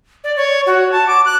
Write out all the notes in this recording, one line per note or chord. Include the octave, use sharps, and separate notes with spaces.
D5
C#5
F#4
A5
D6
F#6